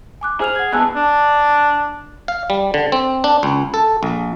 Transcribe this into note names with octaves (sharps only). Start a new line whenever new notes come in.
G#5 D6 F#6
G#4 C5 F6 F7
F#5 G#6
B2 G#3 A5 E6 F#6
D4
F5
G3
D3
C4
D4
C#2
A4
A#1